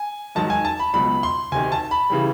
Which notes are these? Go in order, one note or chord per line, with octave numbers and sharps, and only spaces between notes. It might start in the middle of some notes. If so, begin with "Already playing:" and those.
Already playing: G#5
G#2 D#3 F#3 A5
G#5
A5
B5
C#2 B2 F#3 B5
C6
D2 C3 D#3 G#5
A5
B5
C#3 E3 G3